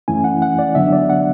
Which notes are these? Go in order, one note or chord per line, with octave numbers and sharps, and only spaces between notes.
F#2 E3 A3 C#4 E4 G#5
F#5
F#5
D5
D3 F#3 B3 D4 E5
D5
F#5